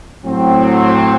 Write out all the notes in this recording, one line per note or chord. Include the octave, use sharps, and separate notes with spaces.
A2 F#3 C4